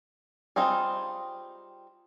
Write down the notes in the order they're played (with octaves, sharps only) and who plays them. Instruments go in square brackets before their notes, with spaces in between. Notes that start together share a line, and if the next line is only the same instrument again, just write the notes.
[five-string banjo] G3 C4 D#4 F4 G#4